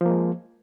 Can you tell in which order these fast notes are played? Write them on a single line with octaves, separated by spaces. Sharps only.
F3 A#3 G#3